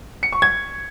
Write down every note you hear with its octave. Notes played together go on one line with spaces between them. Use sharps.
C#7
C#6
G#6